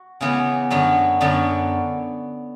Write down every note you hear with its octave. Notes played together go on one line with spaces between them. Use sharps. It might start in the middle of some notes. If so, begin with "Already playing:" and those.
Already playing: F#4
C#3 E3 B3
F#2 D3 F#3 B3
F#2 D3 F#3 B3